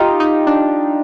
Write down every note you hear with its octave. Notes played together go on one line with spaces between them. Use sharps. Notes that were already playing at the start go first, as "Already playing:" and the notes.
Already playing: D#4 F4 G4
D#4
D4